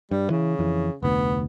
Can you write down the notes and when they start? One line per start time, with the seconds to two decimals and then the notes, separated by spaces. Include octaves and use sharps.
0.11 G2 G3
0.30 C#3 E3
0.59 F2 E3
1.02 F1 D2 B3